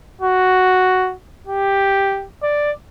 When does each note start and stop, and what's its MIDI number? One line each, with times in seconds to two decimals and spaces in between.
0.21 1.14 66
1.47 2.26 67
2.43 2.71 74